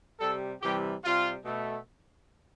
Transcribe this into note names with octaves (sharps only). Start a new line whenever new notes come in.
C3 G3 A4
C3 E3 G3 G4
C3 G3 F4
B2 A3